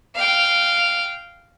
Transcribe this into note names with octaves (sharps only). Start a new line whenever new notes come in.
F5 G5